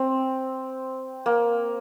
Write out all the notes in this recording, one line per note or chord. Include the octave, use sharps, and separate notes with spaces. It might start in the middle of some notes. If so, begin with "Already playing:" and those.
Already playing: C4
A#3